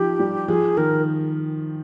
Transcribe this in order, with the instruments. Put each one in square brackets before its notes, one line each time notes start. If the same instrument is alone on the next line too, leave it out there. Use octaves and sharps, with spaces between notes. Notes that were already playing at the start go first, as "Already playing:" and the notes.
Already playing: [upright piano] F3 D#4 [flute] G4
[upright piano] G3
[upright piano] F3 [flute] G#4
[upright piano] D#3 [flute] A#4